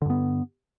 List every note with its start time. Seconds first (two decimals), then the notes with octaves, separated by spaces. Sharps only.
0.02 D3
0.06 G2
0.10 B3